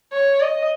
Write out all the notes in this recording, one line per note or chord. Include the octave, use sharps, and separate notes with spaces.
C#5
D#5